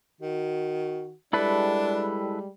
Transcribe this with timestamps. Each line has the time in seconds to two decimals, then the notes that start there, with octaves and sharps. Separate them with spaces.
0.21 D#3 F#4
1.33 G3 G#3 D4 E4 A4 B4